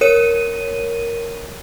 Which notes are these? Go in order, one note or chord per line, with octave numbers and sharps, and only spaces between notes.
A#4 C#5 D#7